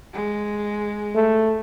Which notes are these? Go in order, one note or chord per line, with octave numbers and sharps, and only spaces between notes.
G#3
A3